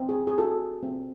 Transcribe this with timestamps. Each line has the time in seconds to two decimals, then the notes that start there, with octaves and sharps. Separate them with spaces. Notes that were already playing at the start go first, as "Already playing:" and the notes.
Already playing: C4
0.09 G#4
0.27 G#4
0.38 F#4 A4
0.83 C4